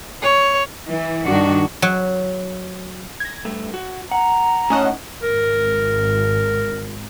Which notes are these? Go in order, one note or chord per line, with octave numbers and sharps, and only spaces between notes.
C#5
E3
G2 D#3 D4 F#4
F#3
G#6 A#6
G2 A3
F#4
F#5 A#5
A2 C#4 D#4 D#5 F#5 A5
G#1 A#4